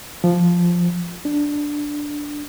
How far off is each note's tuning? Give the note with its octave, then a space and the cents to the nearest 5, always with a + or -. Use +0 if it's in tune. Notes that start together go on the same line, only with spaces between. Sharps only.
F3 +0
D4 +0